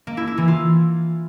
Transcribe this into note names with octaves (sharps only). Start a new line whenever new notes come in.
A#3
E4
E4
E3
F4